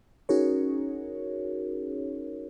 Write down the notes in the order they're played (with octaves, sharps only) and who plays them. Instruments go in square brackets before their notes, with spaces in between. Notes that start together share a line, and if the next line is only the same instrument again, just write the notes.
[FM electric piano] C#4 D#4 F#4 G#4 A#4 C#5